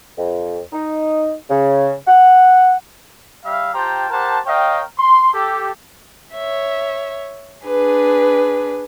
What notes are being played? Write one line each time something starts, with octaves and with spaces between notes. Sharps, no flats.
F2
D#4
C#3
F#5
G3 E5 F5
F4 G4 C5 G5 A5 A#5
G4 A#4 C5 F#5 A5
A#4 C#5 D#5 F5 G5
C6
G4 A4
C#5 E5
D4 G#4 B4